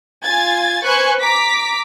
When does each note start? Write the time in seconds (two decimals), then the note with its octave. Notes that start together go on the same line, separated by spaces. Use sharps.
0.23 F4 G#5 G#6 A6
0.84 B4 C5 G#5 C#6 F#6 G#6
1.19 A#5 D6 B6